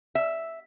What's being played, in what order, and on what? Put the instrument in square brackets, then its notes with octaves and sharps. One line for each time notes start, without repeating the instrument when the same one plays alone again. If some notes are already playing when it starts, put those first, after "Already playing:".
[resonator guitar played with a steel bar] E5